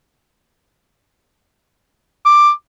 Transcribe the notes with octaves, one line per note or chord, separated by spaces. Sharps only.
D6